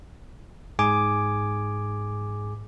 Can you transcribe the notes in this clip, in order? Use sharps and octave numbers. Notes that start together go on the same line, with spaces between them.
G#2 G#4 G#5 D6